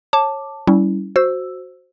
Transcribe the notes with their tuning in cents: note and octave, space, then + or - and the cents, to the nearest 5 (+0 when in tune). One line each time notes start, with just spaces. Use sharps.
C#5 -20 A5 +0 D6 +0
G3 -20 C#4 +15 E4 -15
F#4 -5 C5 +0 E6 +0